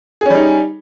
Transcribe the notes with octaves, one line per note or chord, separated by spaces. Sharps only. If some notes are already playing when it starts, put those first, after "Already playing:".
G3 C#4 D#4 G#4